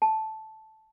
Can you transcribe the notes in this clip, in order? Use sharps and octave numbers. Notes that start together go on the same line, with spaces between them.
A5